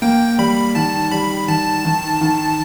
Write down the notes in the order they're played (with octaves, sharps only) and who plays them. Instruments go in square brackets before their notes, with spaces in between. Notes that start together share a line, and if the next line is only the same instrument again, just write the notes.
[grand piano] A#3 [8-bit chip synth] G5
[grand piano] G3 [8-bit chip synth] B5
[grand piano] D#3 [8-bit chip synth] A5
[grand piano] G3 [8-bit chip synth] B5
[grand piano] D#3 [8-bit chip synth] A5
[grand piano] D#3
D#3